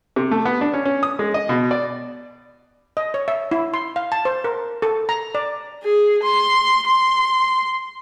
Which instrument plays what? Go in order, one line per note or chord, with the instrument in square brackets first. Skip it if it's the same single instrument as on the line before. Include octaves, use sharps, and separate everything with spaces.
[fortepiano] C3
A3
B3
D4
C#4
C#4
D#6
G#3
D#5
B2
D5
[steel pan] D#5
C#5
E5
E4
C6
F5
A5
C5
A#4
A4
A#5
D5
[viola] G#4
C6
C6